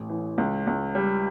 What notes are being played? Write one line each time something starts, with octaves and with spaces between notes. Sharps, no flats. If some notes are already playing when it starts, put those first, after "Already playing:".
Already playing: A1 A2
E3
C#2
C#2
G3